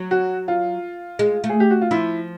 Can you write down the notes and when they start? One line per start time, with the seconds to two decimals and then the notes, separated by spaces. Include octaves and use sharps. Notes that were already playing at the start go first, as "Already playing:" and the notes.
Already playing: F#3
0.11 F#4
0.48 F4
1.19 G#3
1.44 A3
1.49 G#4
1.60 G4
1.70 F#4
1.81 F4
1.91 F3 E4